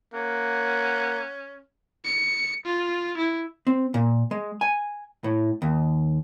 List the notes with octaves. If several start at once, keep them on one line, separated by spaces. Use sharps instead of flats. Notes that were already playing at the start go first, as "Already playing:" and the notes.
A#3 C#4 F#5
C#7
F4
E4
C4
A#2
G#3
G#5
A2
D#2